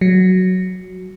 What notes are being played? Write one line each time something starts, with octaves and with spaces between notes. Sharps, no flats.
F#3